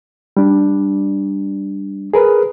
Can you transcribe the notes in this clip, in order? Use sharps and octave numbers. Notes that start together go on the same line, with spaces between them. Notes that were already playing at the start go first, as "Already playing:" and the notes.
G3 D4
G#4 A#4 B4